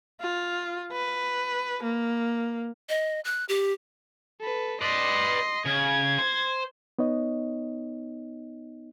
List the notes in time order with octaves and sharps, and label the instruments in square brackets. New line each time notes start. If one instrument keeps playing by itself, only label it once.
[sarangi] F4
B4
A#3
[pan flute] D#5
F#6
G4
[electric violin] A4 B4
[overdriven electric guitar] B4 D5 [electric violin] D#5 C6
[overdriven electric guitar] C#3 [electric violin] G#6
[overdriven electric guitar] C5
[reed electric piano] B3 D#4 C#5 D#5